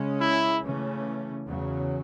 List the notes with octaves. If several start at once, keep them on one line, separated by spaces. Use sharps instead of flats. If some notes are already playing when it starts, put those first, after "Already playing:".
Already playing: C#3 G#3 C#4
E4
C#3 E3 A3 C#4
E2 C#3 F#3